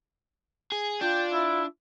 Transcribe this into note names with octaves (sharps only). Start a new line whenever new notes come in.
G#4
D4 F4 G5
E4